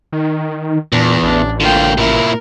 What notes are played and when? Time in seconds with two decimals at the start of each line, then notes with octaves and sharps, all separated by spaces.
0.13 D#3
0.92 E2 A#2 D4
1.23 A1 D4
1.61 D3 A#3 F4 G5
1.98 A#2 E4 A#4